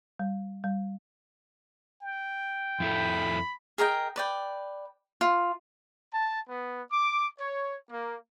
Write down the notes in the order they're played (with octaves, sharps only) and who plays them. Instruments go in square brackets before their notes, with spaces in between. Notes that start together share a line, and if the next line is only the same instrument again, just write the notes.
[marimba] G3
G3
[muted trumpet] G5
[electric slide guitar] F2 E4 A4 [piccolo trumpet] B5
[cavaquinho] G#4 A#4 D#5 G5
B4 D5 G5
F4
[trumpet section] A5
B3
D6
C#5
A#3